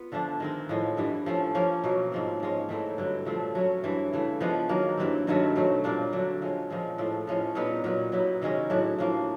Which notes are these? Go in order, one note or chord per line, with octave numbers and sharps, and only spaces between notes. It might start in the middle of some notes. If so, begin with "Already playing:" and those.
Already playing: B3 F4
D3 F3 A3 D4
D#3 G#3 C4
A2 F3 G#3
G2 E3 G3
F3 A3 C#4
F3 A#3 C#4
B2 F#3 A#3
G#2 F3 G#3 C4
G#2 F3 G#3 C#4
E3 A3 C4 D#4
G2 D3 F#3
A#2 F3 A3 C4
F#3 A3 C#4
G2 E3 A3 C4
C#3 E3 A3
F3 G#3 B3 D4
D#3 F#3 A#3
G2 E3 G3 C4
G2 D#3 F#3 A3
B2 F#3 A3 C4
A#2 G3 A#3 D4
D3 F#3 A3
F3 G#3 C#4
A#2 F3 G#3 B3
A2 F3 A3 C4
A2 F3 G#3 C#4
A#2 G3 B3 D#4
A#2 F#3 B3
F#3 B3 E4 G4
C3 D#3 G#3 C#4
A2 F#3 A3 D4
A2 F3 A#3